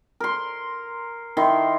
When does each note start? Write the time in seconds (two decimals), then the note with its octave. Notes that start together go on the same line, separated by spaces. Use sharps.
0.20 A#4 C6
1.37 D#3 E4 C6